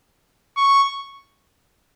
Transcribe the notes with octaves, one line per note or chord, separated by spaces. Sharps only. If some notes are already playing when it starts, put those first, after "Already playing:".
C#6